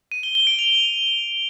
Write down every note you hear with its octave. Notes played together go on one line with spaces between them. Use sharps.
D#7
G7
G7
D7
F7